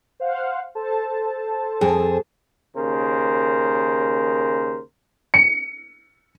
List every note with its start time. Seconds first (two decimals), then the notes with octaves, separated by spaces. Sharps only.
0.20 C5 F5 F#5
0.75 A4 C5 A5
1.81 F2 G#4
2.76 D#2 C#3 A#4 C5
5.34 C#7